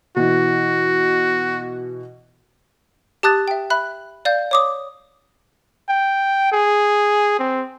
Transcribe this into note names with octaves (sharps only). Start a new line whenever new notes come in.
B2 E3 F#4
G4 A5 D#6 F#6 A6
E5 G5
E5 B5 F#6
D5 F5 G6
C#5 D6 D#6
G5
G#4
C4